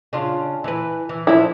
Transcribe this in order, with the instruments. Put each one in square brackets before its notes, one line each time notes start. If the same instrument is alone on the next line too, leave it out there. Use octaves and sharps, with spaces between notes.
[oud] C#3 D4 F4
E3 B4
E3
[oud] F3 D4 [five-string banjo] E4